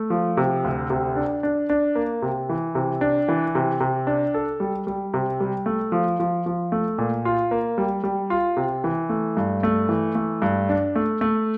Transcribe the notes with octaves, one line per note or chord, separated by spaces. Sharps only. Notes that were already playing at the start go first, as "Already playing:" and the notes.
Already playing: A3
F3
C3
D2
C3
D4
D4
D4
A#3
C3
E3
C3
D4
E3
C3
C3
D4
A4
G3
G3
C3
G3
A3
F3
F3
F3
A3
A#2
F4
A#3
G3
G3
F4
C3
E3
A3
G2
A3
E3
A3
G2
D4
A3
A3